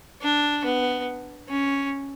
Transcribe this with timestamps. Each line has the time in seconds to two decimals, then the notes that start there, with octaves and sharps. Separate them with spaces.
0.22 D4
0.65 B3
1.49 C#4